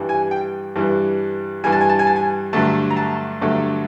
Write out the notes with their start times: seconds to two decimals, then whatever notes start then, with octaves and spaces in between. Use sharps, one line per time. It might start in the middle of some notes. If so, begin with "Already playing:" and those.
Already playing: G2 E3 G3
0.09 G#5
0.31 G5
0.76 G2 E3 G3
1.64 G2 E3 G3 G#5
1.72 A5
1.81 G#5
1.89 A5
1.99 G#5
2.07 A5
2.16 G#5
2.53 G2 D3 F#3 A3 A5
2.90 A#5
2.97 A5
3.41 G2 D3 F#3 A3